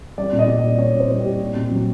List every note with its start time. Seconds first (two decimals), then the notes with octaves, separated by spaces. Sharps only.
0.18 G3 D5
0.32 A#2
0.39 D#5
0.48 G3
0.59 A#2 D5
0.79 G3 C#5
0.95 A#2
1.00 C5
1.11 G3
1.20 G4
1.25 A#2
1.41 A#2
1.56 A#2
1.71 F#3